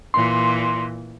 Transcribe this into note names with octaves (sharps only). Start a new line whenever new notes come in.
A#2 E3 C6